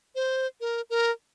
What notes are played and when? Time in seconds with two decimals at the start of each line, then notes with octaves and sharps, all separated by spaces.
0.15 C5
0.61 A#4
0.90 A#4